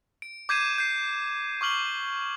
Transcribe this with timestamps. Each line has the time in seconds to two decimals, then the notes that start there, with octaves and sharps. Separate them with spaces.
0.22 D7
0.49 D6 G6 G#6 C7 D#7 E7
0.78 G6 C7
1.61 C#6 D6 F6 F#7 G7